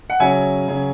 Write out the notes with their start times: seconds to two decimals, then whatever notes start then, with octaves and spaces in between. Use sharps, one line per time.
0.10 F#5
0.20 C#3 F#3 C#4 E5 G#5
0.68 C#3 F#3 C#4